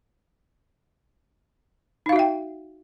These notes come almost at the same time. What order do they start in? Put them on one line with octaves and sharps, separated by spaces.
D#4 F5 F#4 E5 G5